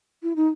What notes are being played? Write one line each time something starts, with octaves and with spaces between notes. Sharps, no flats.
E4
D#4